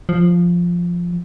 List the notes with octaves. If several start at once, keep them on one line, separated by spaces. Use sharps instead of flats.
F3